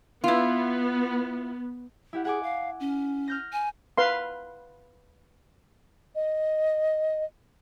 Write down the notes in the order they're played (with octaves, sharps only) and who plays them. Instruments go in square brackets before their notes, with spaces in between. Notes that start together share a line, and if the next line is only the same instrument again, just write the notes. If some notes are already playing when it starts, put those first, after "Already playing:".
[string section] B3 [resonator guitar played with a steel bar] E4 F4
[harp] E4 G4 F#5
[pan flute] G#4 [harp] F#5 G#5 D6
[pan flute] F5
C#4
[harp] F6 G6 A#6
[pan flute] G#5
[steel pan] B4 F5 C6
[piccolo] D#5